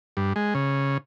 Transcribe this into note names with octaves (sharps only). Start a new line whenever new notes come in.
G2
G#3
C#3